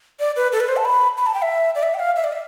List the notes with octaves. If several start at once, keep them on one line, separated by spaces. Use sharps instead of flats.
D5
B4
A4
B4
C5
A5
B5
B5
A5
G5
E5
D5
E5
G5
F5
E5
D5
E5